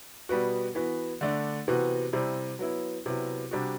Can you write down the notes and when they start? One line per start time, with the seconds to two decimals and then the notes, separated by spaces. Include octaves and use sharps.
0.29 B2 G3 B3 F#4
0.75 E3 B3 F#4
1.21 D3 A3 D4
1.68 C3 E3 B3 F#4
2.13 C3 G3 C4 E4
2.59 F#3 B3 E4
3.06 C3 F#3 B3 E4
3.51 C3 G3 D4 F#4